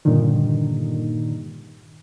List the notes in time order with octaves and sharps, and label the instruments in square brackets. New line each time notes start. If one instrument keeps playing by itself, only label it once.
[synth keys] G2 A#2 D3 D#3